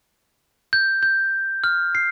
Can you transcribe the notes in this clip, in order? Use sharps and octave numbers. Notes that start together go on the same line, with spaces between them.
G6
G6
F6
C7